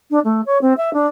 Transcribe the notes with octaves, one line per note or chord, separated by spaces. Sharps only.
D4
A3
C#5
C4
E5
D4